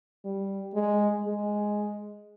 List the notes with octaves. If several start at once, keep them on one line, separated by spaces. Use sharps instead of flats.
G3
G#3
G#3